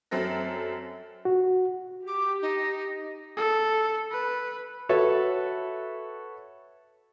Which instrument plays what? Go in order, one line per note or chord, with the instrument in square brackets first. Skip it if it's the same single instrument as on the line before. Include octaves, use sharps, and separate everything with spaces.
[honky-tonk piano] F#2 F#3 C4 A4 A#6
[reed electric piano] F#4
[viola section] G4 [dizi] D6
[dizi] D#4
[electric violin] A4
B4
[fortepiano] F#4 A4 B4 C#5 E5